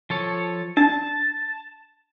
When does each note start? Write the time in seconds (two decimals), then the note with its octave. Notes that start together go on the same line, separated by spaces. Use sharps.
0.10 F3 A4 C#5
0.77 D4 A5